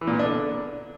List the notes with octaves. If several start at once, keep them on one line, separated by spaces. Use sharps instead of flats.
E3
A#2
B3
D4
D3